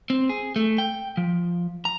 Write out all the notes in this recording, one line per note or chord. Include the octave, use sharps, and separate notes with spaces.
C4
G#4
A3
G5
F3
A#5